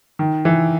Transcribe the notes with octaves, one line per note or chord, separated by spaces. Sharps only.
D#3
E3